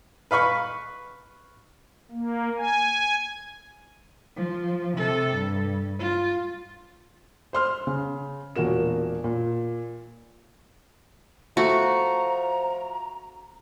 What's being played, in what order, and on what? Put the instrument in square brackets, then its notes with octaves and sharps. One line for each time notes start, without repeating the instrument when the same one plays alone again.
[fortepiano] B4 F5 B5 C#6
[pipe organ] A#3
G#5
[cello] F3
C3 A4
G2
F4
[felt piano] C5 C6 F6
C#3
E1 A#2 F#4 A#4 E7
A#2
[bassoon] F3 [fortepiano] A3 C#6 [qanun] F#4 [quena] A#5